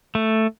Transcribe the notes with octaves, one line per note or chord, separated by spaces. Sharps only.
A3